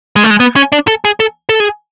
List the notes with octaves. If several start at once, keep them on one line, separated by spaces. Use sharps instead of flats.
G#3
A3
G#3
B3
C#4
D4
A4
G#4
A4
A4
G#4